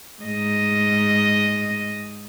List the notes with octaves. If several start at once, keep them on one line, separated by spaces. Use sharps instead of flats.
G#2 D#5